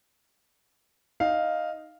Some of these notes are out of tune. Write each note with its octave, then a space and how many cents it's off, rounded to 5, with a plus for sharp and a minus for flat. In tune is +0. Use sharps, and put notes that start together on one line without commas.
D#4 +0 F5 +0